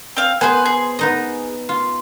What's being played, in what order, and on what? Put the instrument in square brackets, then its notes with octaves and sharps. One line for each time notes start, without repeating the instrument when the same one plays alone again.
[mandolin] C4 F5
[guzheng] B3 C5 [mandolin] G#4 B4 G#5
[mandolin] G#4
[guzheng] B3 D#4 D#5
F4